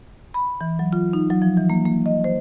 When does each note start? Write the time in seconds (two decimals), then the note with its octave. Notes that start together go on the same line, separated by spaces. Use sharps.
0.34 B5
0.61 E3
0.79 F#3
0.93 F4
1.13 D#4
1.30 F#3
1.42 F3
1.57 E3
1.70 A#3
1.85 A#3
2.06 D#5
2.24 C5